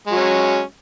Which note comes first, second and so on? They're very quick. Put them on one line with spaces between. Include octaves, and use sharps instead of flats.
G#3 F#3 C#4